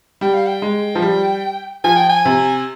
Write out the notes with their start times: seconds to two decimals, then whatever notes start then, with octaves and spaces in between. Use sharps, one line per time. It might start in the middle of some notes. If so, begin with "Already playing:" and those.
0.21 G3 G5
0.34 F5
0.47 G5
0.62 G#3
0.95 F3
1.02 G3
1.84 F3 G#5
1.96 G5
2.09 G#5
2.25 C3